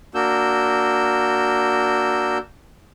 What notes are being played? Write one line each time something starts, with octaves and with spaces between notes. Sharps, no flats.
A#3 D4 F#4 E6 G6